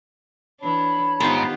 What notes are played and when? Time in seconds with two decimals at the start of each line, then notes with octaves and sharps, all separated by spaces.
0.60 E3 D4 C#5 A5 B5
1.20 G#2 D#3 B3 F4 G4 C5